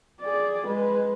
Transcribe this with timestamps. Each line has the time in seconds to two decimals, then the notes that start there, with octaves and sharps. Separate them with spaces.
0.22 G#4 D5
0.67 G#3 B4